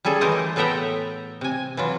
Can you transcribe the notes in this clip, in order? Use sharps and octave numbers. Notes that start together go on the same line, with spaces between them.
G3 C#4 G#4 A4
E3 A3 A#4 C5 D#5
A2 B3 A4 E5 G5 A#5
C3 G#5
E3 F#3 F4